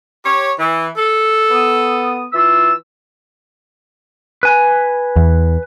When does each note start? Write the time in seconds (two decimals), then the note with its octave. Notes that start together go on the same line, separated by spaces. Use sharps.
0.24 G4 C#5
0.58 E3
0.96 A4
1.50 B3 D#6
2.32 E3 F4 E6
4.43 B4 G#5
5.16 E2